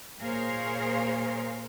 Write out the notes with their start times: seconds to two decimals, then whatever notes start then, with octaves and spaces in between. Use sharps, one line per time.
0.20 A#2 G#4 A#4 C5 C#5 F5